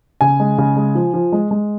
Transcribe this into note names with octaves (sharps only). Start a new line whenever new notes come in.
C#3 G#5
G#3
C#3
G#3
F3
F3
G#3
G#3